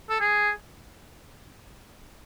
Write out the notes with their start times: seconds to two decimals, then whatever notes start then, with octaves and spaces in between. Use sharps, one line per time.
0.10 A4
0.21 G#4